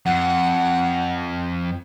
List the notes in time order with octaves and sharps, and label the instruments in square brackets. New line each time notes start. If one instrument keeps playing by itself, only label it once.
[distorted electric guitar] F2 [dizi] F#5